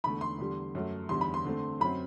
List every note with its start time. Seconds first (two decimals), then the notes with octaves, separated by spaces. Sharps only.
0.04 E2 D3 A3 B5
0.21 C6
0.38 E2 D3 G3
0.75 F#2 F#3 A3
1.09 E2 D3 G3 C6
1.21 B5
1.34 C6
1.45 D3 A3 C4
1.80 F#2 F#3 C4 B5